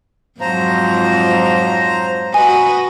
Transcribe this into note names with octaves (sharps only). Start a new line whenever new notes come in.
F2 G#2 F3 F#3 C5 A#5
F#4 B4 D#5 G#5